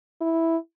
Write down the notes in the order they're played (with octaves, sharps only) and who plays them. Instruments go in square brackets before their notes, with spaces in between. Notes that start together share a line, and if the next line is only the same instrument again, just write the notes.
[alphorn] E4